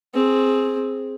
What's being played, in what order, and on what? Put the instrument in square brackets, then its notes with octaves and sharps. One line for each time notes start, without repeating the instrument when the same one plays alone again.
[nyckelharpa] C4 G#4